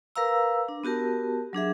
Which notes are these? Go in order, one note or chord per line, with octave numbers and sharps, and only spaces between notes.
A#4 B4 F5 A#5 E6
D4
B3 F#4 G4 A#4 A5
F#3 D4 G#4 E5